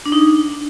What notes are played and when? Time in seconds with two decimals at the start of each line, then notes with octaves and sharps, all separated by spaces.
0.06 D4
0.12 D#4
0.19 D4